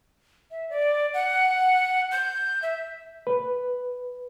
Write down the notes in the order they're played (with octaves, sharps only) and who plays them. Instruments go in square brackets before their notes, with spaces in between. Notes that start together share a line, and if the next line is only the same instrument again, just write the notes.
[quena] E5
D5
F#5
G6
E5
[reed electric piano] B4